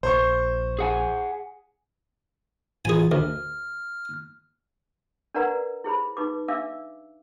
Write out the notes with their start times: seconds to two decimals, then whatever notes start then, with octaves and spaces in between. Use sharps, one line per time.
0.03 A#1 C5 C#6
0.79 G#4 F#5 G#5
2.85 A2 E3 F4 G#4 G#5
3.12 D2 F6
5.34 D4 A#4 B4 D5 F#5 A#5
5.84 E4 G#4 C5 B5
6.17 D#4 B4 D6
6.48 D4 E5 F5 D6 E6